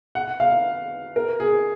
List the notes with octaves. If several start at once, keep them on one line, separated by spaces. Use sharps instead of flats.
F#5
F5
A#4
G#4